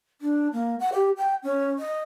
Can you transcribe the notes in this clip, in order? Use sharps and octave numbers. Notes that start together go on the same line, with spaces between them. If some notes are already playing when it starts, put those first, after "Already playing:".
D4
A#3
F#5
G4
G5
C#4
D#5